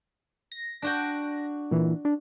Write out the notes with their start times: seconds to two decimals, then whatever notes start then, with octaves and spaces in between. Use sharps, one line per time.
0.52 A#6
0.82 D4 F#4 G5
1.71 A#2 E3
2.05 D4